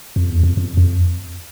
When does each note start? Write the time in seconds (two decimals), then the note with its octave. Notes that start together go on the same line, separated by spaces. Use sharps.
0.16 F2
0.30 E2
0.43 F2
0.57 F2
0.77 F2